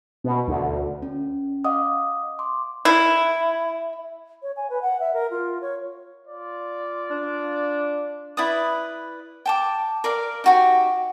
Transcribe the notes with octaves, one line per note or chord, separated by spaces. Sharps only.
B2
D2
C#4
D#5 F5 F#5 D6 D#6
C6 D6
E4
C#5
G#5
B4
F#5
E5
A#4
F4
C#5
F4 D5
D4
E4 B4 D5 D#6
G5 A5 D6
A#4 D5 F5 D6
D#4 F#4 G4